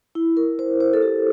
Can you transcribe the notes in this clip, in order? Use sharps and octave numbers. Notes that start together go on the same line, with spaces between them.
E4
A#4
C5
C5
A4
G4